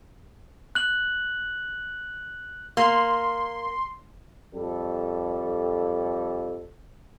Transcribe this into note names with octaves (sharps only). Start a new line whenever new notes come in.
F#6 F#7
A#3 C6
F2 G3 A4